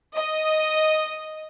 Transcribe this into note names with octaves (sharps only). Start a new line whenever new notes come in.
D#5